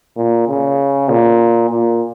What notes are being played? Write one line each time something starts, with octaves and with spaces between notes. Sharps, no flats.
A#2
C#3
A#2
A#2